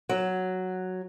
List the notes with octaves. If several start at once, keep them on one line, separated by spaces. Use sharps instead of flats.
F#3